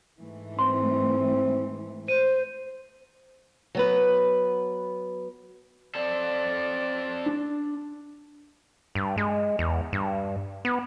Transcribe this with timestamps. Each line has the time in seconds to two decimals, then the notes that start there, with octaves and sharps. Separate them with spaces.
0.18 G#2 E3 A3
0.59 C4 C6
2.08 C5 D#7
3.75 F#3 B3 B4
5.95 C4 A4 D5
7.26 D4
8.95 G2
9.18 G#3
9.59 E2
9.93 G2
10.65 B3